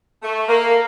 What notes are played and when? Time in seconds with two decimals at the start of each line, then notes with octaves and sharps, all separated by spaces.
0.22 A3
0.49 A#3